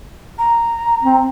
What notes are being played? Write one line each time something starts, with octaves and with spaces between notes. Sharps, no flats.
A#5
C4